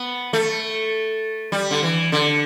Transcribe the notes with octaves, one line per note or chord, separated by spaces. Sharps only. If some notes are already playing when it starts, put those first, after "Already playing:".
Already playing: B3
A3
G3
D3
E3
D3